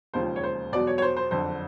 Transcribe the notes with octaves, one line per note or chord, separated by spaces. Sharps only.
E1 D#2 C#3 F3 C5
C#5
C5
E2 B2 F#3 D5
C#5
C#5
C5
C5
F#1 F2 D3 C5